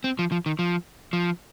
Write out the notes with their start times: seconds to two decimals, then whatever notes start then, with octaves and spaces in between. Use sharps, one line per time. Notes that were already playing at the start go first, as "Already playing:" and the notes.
0.04 C4
0.19 F3
0.32 F3
0.46 D#3
0.59 F3
1.13 F3